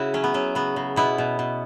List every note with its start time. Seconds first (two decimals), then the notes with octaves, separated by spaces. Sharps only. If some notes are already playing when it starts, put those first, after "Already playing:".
Already playing: C#3 E4 F#4
0.14 F#3 C#4
0.24 B3
0.34 F#3 C#4
0.55 C#3 B3
0.76 C#3
0.96 B2 B3 E4
1.18 B2
1.39 B2